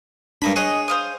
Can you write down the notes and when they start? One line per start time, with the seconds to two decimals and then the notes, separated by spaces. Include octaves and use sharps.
0.42 G2 A#3 D4 B5
0.56 G#4 C#5 D#5 F#5
0.88 C5 F5 D#6